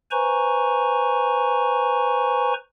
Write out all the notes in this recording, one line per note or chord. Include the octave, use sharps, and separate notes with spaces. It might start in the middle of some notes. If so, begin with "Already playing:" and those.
B4 C5 G#5 A#5 C#6